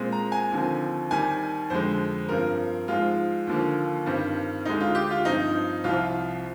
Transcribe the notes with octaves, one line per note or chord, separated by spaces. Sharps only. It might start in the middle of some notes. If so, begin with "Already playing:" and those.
Already playing: A#2 G#3 C4
A#5
G#5
D#2 D3 F3 C4
D#2 D#3 G3 G#5
F2 D3 G#3 C5
G2 F3 C4 A#4
G#2 F3 G#3 F4
D#2 D3 F3 A#3
G2 D#3 G3 C4
D2 D3 G#3 D#4
F4
G4
F4
G2 F3 C4 D#4
C2 C3 F3 F4